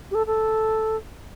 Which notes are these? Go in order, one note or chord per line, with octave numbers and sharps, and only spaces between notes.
G4
A4
A4